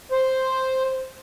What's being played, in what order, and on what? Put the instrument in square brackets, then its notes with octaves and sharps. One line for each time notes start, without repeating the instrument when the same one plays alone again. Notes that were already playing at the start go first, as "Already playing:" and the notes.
[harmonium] C5